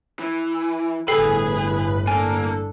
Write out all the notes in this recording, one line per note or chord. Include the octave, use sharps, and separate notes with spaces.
E3
G1 A2 G#4 A4 B4 G#5 C7
A#3 D4 A4 G#5